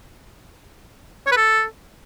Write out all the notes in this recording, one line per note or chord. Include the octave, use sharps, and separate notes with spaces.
C#5
B4
A4